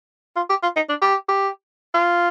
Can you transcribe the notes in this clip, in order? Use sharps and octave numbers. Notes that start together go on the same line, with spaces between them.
F4
G4
F4
D#4
D4
G4
G4
F4